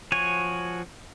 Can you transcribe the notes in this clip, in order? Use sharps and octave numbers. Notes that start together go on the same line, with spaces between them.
F3 F#4 C#5 G#5